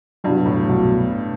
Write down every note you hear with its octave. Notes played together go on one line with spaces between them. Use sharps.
C2 G2 B2 F#3
A2
C2 B2 F#3